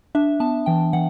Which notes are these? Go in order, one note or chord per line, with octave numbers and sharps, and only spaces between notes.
D4 E5
B3 A5
E3 G5
E3 F#5